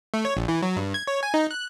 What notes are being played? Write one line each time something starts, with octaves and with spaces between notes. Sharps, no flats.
A3
C#5
A#1
E3
F#3
G2
G#6
C#5
G#5
D#4
F#6